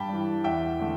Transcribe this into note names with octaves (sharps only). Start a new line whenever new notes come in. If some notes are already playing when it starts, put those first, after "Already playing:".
Already playing: G2 G5 A5 B5
E3 G3
E2 E5 G5
D3 A3